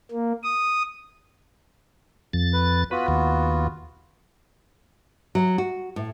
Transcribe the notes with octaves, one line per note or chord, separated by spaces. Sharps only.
A#3
D#6
F2 A6
B4
B3 F4 F#4 B4
D#2
F#3
F#4
A2